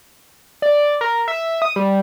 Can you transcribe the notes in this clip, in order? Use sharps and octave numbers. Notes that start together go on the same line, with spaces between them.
D5
A#4
E5
D#6
G3